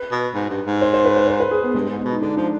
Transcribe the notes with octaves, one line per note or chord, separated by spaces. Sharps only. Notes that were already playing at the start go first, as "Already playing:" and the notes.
Already playing: B4
B2
G#2
G2
G#2
C5
C5
B4
C5
C5
B4
G#4
B3
G2 G#3
G#2
B3
B2
D#4
D3 D4
F3 D4